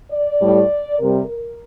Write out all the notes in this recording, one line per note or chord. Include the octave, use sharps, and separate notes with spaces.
D5
A2 G3
C3 G3 A#4
A#4